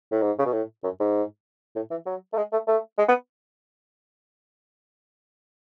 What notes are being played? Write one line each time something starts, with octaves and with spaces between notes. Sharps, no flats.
A2
G#2
C#3
B2
A2
F#2
G#2
A2
E3
F#3
A3
G#3
A3
A3
G#3
B3